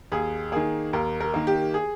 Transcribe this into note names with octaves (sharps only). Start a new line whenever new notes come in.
D#2 G#4
D#3 A#3 G#4
D#2 A#4
A#4
D#3 A#3
G4
G#4